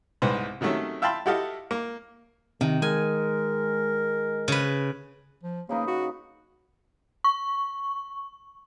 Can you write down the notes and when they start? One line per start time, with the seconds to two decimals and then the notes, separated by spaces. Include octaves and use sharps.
0.22 C2 G#2 B3 B4 C5
0.61 C3 D#3 F#3 A3 C#4
1.02 E5 F5 G5 A5 B5 C6
1.26 E4 F#4 G4 A4 D#5 F5
1.71 A#3
2.61 C3 D#3
2.82 G#3 A#4 G#5
4.48 C#3 B4
5.43 F3
5.69 C#3 A#3 D#4 B4
5.87 F#4
7.24 C#6